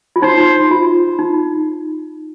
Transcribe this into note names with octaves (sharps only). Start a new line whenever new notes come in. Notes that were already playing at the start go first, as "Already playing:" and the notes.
F4
D#4 C5
F4
D#4